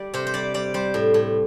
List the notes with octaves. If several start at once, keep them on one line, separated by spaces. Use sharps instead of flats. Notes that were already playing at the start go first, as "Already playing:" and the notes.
Already playing: G3 D5
C3 C5
C5
G3 D5
G3 D5
G3 C5
A2
A2